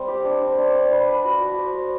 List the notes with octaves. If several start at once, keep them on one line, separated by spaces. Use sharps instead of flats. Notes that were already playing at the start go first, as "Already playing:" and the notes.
Already playing: G3 C4
G4
D4
C5
D4
D4
B4
B4
F#4
F#4
C5
C5